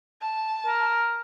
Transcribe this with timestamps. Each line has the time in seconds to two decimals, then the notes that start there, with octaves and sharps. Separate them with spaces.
0.22 A5
0.66 A#4